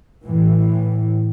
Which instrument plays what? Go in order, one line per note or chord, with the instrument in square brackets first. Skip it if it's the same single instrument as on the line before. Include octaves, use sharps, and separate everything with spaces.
[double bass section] A2 E3